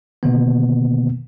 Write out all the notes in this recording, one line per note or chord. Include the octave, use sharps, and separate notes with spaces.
B2 D3 D#3 A#3 B3